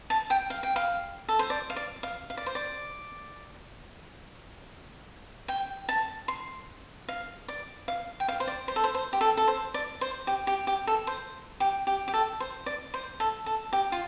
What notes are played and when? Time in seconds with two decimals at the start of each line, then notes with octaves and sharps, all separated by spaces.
0.10 A5
0.30 G5
0.50 F5
0.63 G5
0.76 F5
1.29 A4
1.39 C5
1.50 D5
1.70 F5
1.76 D5
2.03 F5
2.30 F5
2.37 D5
2.46 C5
2.55 D5
5.48 G5
5.89 A5
6.28 C6
7.08 F5
7.48 D5
7.88 F5
8.20 G5
8.28 F5
8.40 C5
8.47 D5
8.68 C5
8.76 A4
8.84 C5
8.95 C5
9.13 G4
9.21 A4
9.37 A4
9.48 C5
9.74 D5
10.01 C5
10.27 G4
10.47 G4
10.67 G4
10.87 A4
11.07 C5
11.60 G4
11.87 G4
12.08 G4
12.14 A4
12.40 C5
12.66 D5
12.94 C5
13.20 A4
13.46 A4
13.73 G4
13.92 F4